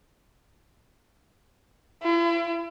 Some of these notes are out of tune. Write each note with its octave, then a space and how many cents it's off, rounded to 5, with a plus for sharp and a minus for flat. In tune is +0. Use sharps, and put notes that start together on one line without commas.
E4 +45